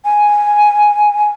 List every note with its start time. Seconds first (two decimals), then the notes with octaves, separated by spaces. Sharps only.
0.05 G#5